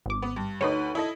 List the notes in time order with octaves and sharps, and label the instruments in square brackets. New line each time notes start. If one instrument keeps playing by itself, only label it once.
[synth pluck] G#1 D6
[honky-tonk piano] B3
G2
[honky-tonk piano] D2 B4 [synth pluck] D#4 C#5
[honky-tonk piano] E4 A4 D#5